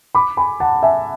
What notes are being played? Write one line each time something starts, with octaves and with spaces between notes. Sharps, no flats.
B5 D6
G#5 B5
F#5 A5
E5 G#5